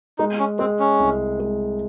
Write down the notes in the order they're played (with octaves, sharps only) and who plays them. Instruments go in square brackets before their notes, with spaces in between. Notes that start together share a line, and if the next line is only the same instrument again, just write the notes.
[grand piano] G#3 [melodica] D#4
[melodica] C#4
[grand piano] G#3 [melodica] C4
[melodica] C#4
[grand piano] C2
G#3